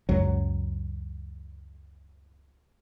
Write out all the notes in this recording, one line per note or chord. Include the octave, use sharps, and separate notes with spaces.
C#2 F#2 F#3